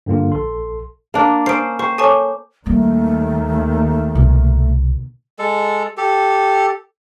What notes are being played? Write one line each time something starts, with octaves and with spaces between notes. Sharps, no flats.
G2 D3 A#3 F4
A#1 A4 C6
A#3 D4
C#4 C5 G#5 D#6 C7 D7
C5 G5 C#6
A4 C#5 G#5 A5 C#6 D6
D#2 D#3 G3 A3 A#3
C2 B2 D3
G#3 A4
G4 A4